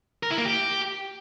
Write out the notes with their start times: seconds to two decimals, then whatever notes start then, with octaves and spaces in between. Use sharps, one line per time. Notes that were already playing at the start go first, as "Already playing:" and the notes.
0.23 A#4
0.30 E4
0.38 A#3
0.45 G4